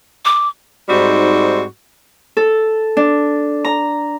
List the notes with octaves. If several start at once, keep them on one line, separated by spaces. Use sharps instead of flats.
D6
G#2 G3 C4 D#4 F#4
A4
D4
A#5